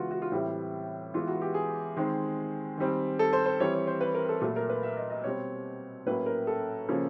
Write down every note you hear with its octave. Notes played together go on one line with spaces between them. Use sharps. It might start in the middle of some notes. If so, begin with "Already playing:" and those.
Already playing: C#3 E3 G#3 B3 F4 F#4
F#4
F4
A2 E3 G3 C4 E4
E3 G#3 B3 F4
F#4
G4
G#4
D#3 G#3 C4
D#3 G3 C4
A4
C5
C5
E3 G3 C4 C#5
C#5
C5
B4
A#4
A4
A#2 F#3 A3 A4
A#4
B4
E5
D#5
D#5
B2 G3 C4 C#5
A2 F#3 A#3 C#4 B4
A#4
A4
C#3 F3 A#3 C#4